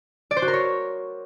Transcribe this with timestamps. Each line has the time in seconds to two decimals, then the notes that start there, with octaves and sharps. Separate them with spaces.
0.31 D5
0.37 C5
0.42 F#4
0.48 A#4
0.53 C#5